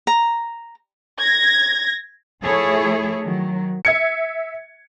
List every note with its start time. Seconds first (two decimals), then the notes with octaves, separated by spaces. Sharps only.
0.07 A#5
1.20 G#6 A#6
2.42 F3 A3 E4 G#4 A4 C#5
3.25 D#3 F#3
3.85 E5 G#6 C#7